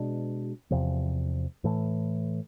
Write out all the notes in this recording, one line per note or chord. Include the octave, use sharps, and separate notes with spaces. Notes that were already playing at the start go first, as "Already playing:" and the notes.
Already playing: B2 G#3 D4
E2 C3 F3
A2 E3 A3